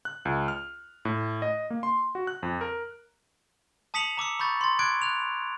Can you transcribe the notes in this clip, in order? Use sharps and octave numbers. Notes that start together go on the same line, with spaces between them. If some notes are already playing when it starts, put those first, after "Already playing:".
F#6
C#2
F6
A2
D#5
A#3
C6
F#4
F#6
F2
A#4
A5 D#6 B6 C#7 F7 F#7
A#5 D6 E6 C#7
B5 C#6 G6 A6
C6 A6
D6 F#6 G#6 D7
F#6 F7